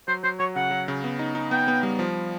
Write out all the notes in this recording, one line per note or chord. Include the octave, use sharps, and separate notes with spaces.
F#3 C5
F#3 C5
F#3 C#5
C#3 F#5
F#3
C#3
B3
D#4
D#4
B3 G5
B3
G3
F3